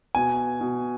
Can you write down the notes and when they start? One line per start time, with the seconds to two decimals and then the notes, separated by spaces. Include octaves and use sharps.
0.15 B2 G#5
0.61 B2